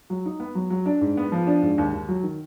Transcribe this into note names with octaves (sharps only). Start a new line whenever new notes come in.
F#3
D#4
B3
F#3
F#3
D4
G#2
B3
F3
D4
G#2
D#2
D#2
F#3
D#3